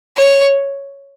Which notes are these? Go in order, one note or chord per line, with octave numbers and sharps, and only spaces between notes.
C#5